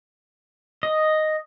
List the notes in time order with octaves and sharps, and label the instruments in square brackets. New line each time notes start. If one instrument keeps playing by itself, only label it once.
[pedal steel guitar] D#5